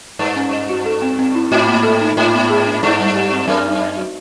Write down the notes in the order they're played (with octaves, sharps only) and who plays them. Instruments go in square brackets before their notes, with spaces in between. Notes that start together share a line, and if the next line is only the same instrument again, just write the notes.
[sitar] G2 [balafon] B4
[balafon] C#4
D#5
F#4
A4
C4
C4
E4
[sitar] G#2 [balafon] F#4
[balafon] A#3
A4
D#4
[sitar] G#2 [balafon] F4
[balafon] B3
G#4
D4
[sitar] G2 [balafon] E4
[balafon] G3
G4
C4
[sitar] F#2 [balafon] A#4
[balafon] D#4
D#5
F#4